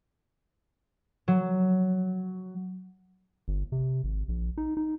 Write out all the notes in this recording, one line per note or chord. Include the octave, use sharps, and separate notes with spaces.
F#3
G1
C3
G#1
A#1
D#4
D#4